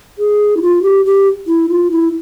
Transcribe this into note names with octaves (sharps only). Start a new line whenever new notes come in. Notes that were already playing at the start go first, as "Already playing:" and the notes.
G#4
E4
F4
G4
G4
E4
F4
E4